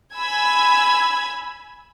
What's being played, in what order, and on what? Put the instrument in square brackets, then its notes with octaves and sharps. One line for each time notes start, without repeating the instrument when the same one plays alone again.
[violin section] G#5 B5 E6 G#6